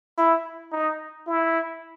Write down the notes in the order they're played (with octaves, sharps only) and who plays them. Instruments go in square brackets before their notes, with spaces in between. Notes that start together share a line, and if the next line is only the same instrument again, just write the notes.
[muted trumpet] E4
D#4
E4